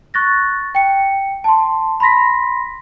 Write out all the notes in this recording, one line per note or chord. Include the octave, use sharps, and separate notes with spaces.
C#6 F#6 A6 A#6
G5 C#7
A5 C6
B5 C6 A#6 B6